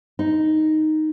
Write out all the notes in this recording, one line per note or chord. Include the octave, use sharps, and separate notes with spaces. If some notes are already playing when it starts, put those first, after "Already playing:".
D#4